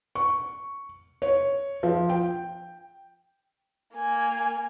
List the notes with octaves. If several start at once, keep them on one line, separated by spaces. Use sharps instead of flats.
C#6
C#5
F3
G5
A#3 G#5